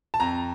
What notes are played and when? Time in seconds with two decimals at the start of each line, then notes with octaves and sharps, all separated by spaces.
0.14 A5
0.20 F2 A#5